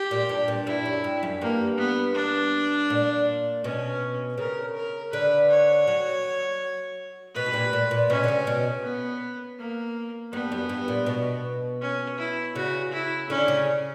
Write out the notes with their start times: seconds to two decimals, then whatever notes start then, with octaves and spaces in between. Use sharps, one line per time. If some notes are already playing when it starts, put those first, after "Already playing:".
Already playing: G4
0.11 A#2
0.29 G2
0.48 A#2
0.67 G2 E4
0.86 F#2
1.04 G2
1.23 F#2
1.41 G2 A#3
1.78 B3
2.15 D4
2.90 A#2
3.64 B2 C#4
4.38 C#3 A#4
4.75 A#4
5.12 D3 B4
5.50 C#5
5.87 F#3
7.35 B2 B4
7.46 G2
7.53 A#2
7.73 A#2
7.91 A#2
8.10 B2 C#4
8.24 D3
8.28 C#3
8.47 B2
8.84 B3
9.59 A#3
10.33 G2 B3
10.52 F#2
10.69 G2
10.88 A#2
11.06 B2
11.81 C#4
12.19 E4
12.55 C#3 F#4
12.93 E4
13.30 D3 C#4
13.48 C#3